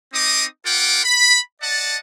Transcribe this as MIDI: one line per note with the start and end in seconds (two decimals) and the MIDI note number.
0.13 0.45 60
0.13 0.45 63
0.13 0.45 75
0.13 0.45 86
0.13 0.45 87
0.65 1.01 65
0.65 1.01 70
0.65 1.01 78
0.65 1.01 79
0.65 1.01 86
1.04 1.40 83
1.62 1.97 74
1.62 1.97 75
1.62 1.97 78
1.62 1.97 81